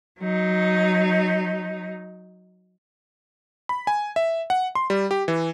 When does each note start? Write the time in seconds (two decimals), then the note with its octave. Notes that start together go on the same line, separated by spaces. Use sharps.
0.19 F#3 D#4
3.69 B5
3.87 G#5
4.16 E5
4.50 F#5
4.75 C6
4.90 G3
5.11 G4
5.28 E3